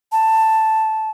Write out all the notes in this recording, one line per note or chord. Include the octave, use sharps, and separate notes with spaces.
A5